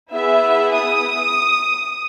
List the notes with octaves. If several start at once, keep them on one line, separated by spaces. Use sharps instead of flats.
B3 E4 G#4 E5
D#6